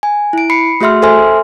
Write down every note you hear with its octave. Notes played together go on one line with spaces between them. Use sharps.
G#5
E4 D7
B5 C7 C#7
A3 F#4 G#4 E5 C6 F6
A4 C5 E5 G#5 C6 F6